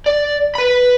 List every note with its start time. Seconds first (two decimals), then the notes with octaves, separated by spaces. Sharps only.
0.06 D5
0.55 B4 B5